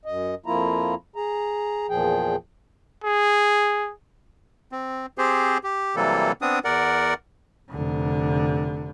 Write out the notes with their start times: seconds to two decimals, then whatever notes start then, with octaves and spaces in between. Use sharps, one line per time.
0.05 F#2 D#5
0.46 F2 F3 A#3 E4 F4 A#5
1.16 G#4 A#5
1.89 E2 A#2 F3 G#4 G5
3.04 G#4
4.72 C4
5.18 C4 G4 G#4 C5
5.64 G4
5.96 C3 E3 F#3 G3 A#3 A4
6.42 B3 C4 D4 D#6
6.64 E2 A#4 D5 F#5
7.70 F1 D3